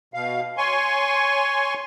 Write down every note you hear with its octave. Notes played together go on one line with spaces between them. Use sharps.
B2 F5
C#5 G#5 C6 C#6